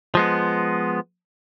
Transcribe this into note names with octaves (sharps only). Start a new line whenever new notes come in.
F3 G#3 B3